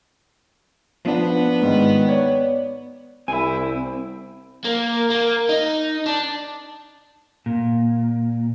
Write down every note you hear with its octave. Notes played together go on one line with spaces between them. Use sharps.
F3 B3 D4
G#2 D#3
C#5 D5
C2 C4 E4 G#5
A#3
A#3
D#4
D4
A#2